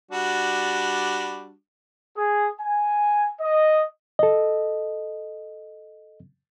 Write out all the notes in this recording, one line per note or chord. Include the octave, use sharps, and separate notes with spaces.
G3 D4 F#4
G#4
G#5
D#5
A4 D#5